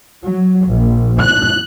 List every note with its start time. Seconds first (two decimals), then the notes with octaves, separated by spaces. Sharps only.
0.24 F#3
0.68 A#1
1.20 F#6